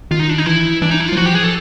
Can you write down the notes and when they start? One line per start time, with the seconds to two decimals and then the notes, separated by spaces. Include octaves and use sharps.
0.11 D#3 F4
0.19 D#4
0.29 D4
0.38 D#4
0.46 E3 E4
0.82 E3 D4
0.91 D#4
1.00 E4
1.08 F4
1.12 F#3
1.17 F3 F#4
1.26 G4
1.35 G#4
1.44 A4